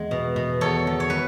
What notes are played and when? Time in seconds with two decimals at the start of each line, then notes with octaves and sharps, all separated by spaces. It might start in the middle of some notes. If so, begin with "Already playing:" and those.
Already playing: E2 G#3
0.11 B2
0.36 B2
0.61 E2 A4 C#5
0.87 E2
1.00 C#5
1.10 B4